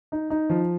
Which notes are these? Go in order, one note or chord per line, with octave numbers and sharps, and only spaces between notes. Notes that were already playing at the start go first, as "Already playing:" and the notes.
D#4
D#4
F3